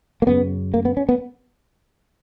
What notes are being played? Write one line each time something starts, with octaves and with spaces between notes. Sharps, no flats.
A#3
F#2 C#3 B3
A#3
B3
C#4
B3